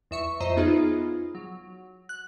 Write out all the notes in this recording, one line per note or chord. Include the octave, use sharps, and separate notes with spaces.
E2 E5 C#6
F2 C5 D#5 E5 A#5
B3 D#4 F4 G#4
F#3
F#6